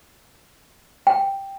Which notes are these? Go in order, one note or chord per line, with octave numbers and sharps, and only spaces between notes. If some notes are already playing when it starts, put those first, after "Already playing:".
G5